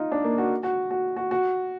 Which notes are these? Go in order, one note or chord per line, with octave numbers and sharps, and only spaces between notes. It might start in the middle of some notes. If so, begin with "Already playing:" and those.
Already playing: D#4 F4
D4
A#3
F#4
F#4
F#4
F#4
F#4